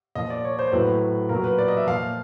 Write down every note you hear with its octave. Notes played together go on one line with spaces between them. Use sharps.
A#2 F3 D#5
D5
C#5
C5
A2 F#3 B4
A#2 F#3 A#4
B4
D5
D#5
E5
A#2 F3 F5